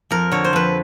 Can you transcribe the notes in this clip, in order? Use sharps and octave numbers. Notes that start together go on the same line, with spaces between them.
F2 A#4
D3 C#5
C5
F2 B4